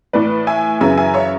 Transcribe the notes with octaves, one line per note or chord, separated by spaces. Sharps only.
A2 E3 B4 D5
E5 G#5
F#2 C#3 E3 E5 G#5
E5 G#5
C#5 E5